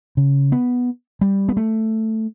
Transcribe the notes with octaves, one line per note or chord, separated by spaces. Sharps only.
C#3
B3
G3
B3
A3